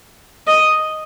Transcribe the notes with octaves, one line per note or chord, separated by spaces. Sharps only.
D#5